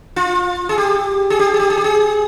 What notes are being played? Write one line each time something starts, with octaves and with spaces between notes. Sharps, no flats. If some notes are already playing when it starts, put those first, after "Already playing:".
F4
G#4
G4
G#4
G4
G#4
G4
G#4
G4
G#4